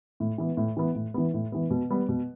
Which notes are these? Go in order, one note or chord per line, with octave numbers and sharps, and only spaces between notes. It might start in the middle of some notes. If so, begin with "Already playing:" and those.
A2
E3 B3
A2
E3 B3
A2
E3 B3
A2
E3 B3
B2
G3 B3
B2